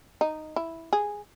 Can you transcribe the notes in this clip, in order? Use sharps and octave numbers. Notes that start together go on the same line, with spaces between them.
D#4
E4
G#4